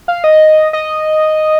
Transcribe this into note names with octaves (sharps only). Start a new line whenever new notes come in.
F5
D#5
D#5